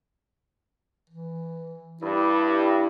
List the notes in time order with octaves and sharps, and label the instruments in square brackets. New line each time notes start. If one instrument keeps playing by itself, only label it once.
[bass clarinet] E3
[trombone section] G2 [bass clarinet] E4